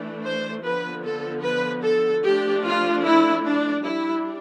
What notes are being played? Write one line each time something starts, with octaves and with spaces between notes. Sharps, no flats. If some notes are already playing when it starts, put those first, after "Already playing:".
Already playing: E3 A3 D4
C5
D3 F3 B3 B4
A4
B4
A4
F3 A3 D4 G4
F4
E4
D4
G3 D4 E4